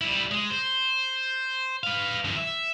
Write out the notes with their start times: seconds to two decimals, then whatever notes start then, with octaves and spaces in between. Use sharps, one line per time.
0.01 G3 E4
0.32 G#3
0.50 C5
1.84 B4 F5
2.25 F#2 E3
2.37 E5